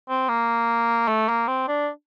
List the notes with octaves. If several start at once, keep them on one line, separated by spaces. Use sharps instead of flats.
C4
A#3
A3
A#3
C4
D4